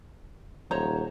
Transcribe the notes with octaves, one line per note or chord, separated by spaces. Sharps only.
D#1 C5 C#5 A#5